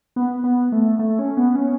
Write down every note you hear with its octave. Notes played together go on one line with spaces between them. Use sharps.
B3
B3
A3
A3
C#4
B3
C#4